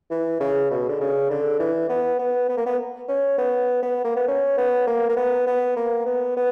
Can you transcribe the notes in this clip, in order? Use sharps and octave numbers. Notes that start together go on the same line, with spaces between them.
E3
C#3
B2
D3
C#3
D3
E3
B3
B3
B3
A#3
B3
C#4
B3
B3
A#3
B3
C#4
B3
A#3
A#3
B3
B3
A#3
B3
B3